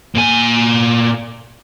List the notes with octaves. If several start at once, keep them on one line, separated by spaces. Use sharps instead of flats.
A#2 G#5